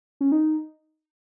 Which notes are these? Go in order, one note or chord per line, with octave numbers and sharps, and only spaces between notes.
C#4
D#4